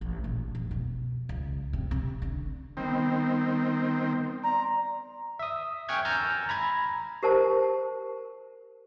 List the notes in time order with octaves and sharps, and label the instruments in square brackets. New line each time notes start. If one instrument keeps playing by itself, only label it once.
[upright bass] A1
A#1
F2
B2
C#2
C3
C3
D3
[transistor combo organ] D#3 C4 [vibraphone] G3 B3
[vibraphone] D5 C6 [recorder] A#5
[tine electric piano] E5 D#6
G5 G#5 C#6 F6 F#6 G#6
G#5 A#5 E6 F6 G6 A6
A#5 B5 G#6
[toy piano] G4 A#4 C5 A5